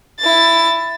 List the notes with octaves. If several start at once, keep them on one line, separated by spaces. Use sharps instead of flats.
E4 A6